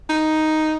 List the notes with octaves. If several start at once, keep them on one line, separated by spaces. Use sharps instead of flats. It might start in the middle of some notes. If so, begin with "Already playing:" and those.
D#4